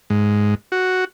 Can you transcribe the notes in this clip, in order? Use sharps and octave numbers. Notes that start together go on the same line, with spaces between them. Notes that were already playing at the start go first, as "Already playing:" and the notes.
G#2
F#4